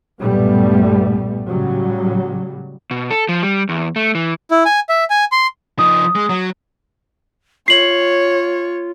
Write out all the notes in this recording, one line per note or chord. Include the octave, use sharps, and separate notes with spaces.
B1 G2 A#2 G3 A3 B3
A2 C#3 F#3 G3
B2
A4
F3
G3
E2
A3
E3
E4
G#5
E5
G#5
C6
F3 D#4 D#6
G#3
F#3
F4 C#5 C7 F#7